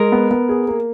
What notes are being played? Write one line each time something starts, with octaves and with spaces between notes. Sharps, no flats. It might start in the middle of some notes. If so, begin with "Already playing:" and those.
Already playing: G#3 A#4
B3
B3
G#4
A#3